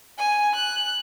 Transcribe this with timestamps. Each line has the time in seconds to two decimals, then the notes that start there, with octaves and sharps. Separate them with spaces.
0.18 G#5
0.55 F#6